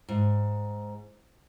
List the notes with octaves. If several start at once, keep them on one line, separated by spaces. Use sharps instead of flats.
G#2